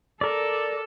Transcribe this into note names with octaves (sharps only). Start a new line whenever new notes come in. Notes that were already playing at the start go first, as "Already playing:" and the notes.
A4 A#4 D5